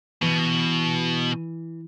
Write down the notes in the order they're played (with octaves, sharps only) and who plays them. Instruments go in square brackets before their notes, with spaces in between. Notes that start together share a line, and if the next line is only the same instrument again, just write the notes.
[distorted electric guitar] B2 [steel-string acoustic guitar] E3